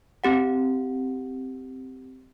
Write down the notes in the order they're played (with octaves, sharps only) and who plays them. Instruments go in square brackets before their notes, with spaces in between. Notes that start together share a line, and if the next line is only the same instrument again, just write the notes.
[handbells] C4 G4 F#5